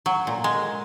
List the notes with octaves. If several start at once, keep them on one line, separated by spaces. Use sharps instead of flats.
F#3
A#2
G#3